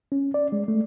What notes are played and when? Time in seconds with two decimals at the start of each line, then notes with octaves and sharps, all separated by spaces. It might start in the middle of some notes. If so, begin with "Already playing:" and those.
0.12 C#4
0.34 D5
0.52 G#3
0.68 A3